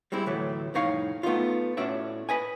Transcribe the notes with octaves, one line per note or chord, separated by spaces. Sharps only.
G3 G#3 C4 E4
D2 A2 E3 F#3 A3
C2 F2 A2 D#4 C#5 F5
A3 B3 C4 D#4 F4
A2 C#4 D4 F#4 D5 E5
B4 D#5 G#5